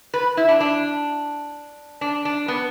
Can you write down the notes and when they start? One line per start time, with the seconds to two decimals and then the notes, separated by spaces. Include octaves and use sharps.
0.14 B4
0.37 E4
0.48 D4
0.60 D4
2.01 D4
2.25 D4
2.48 B3